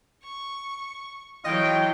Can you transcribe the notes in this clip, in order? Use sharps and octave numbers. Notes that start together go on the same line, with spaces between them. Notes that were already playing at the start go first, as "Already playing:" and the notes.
C#6
E3 F#3 F4 D#5 G5